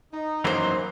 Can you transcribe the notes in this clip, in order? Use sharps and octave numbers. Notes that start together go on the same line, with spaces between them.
D#4
F#2 E3 F#3 A#3 C5